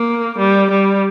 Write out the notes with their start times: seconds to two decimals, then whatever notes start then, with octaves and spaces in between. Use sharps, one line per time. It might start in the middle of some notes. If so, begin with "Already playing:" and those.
Already playing: A#3
0.38 G3
0.71 G3